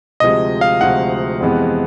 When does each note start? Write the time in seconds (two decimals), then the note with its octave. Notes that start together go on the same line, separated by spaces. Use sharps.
0.20 D2 C3 F3 G#3 D#5
0.61 F5
0.81 D2 C3 F3 G#3 F#5
1.41 F2 C3 E3 G#3 B3